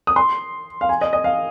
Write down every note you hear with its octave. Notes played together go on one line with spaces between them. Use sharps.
D#6
C6
F5
G#5
D#5
D#5
F5